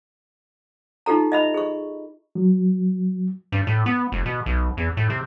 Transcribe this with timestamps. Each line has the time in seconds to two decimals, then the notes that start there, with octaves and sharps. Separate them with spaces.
1.06 D#4 F4 G4 A4 A#5
1.32 D#5 E5 B5
1.54 G#4 C#6
2.35 F#3
3.52 G2
3.67 A2
3.86 B3
4.12 F1
4.26 B2
4.46 B1
4.77 E2
4.97 A2
5.10 C3